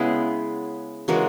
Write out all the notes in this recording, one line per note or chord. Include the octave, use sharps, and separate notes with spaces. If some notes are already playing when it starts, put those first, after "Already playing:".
Already playing: C#3 G#3 B3 E4 G#4
C#3 E3 G#3 F#4 A#4